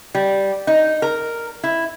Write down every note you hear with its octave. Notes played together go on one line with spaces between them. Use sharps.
G3
D#4
A#4
E4